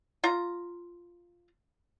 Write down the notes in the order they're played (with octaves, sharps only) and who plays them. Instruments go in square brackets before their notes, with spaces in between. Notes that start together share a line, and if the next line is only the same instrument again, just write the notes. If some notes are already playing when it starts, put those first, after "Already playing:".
[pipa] F4 A#5